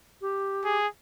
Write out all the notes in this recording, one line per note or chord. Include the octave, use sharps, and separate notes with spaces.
G4
G#4